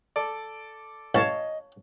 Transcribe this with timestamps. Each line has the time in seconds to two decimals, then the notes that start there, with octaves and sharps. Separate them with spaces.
0.16 A4 D5
1.15 A1 C#5 D#5 F5 A5